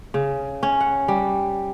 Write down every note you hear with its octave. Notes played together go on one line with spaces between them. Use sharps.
C#3
C#4
F#5
G3